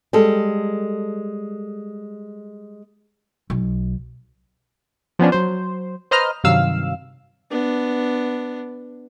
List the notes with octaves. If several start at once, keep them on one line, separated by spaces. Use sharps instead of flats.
G3 G#3 A4
B1
F3 B3 C#4 D4
F#3 C5
B4 C5 D#5 A#5 F6
G2 C3 D#3 F#3 F5 E6
B3 D4